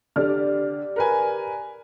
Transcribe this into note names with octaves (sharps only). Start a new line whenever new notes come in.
D3 G4 D5 F6
A#4 B4 G#5